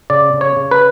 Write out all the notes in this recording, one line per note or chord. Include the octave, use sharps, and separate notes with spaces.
C#3 D5
C#3
C#5
C#3
B4